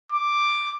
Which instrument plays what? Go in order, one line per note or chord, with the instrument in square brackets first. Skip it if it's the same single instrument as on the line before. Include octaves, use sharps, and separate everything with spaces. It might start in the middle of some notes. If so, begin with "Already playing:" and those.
[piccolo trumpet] D6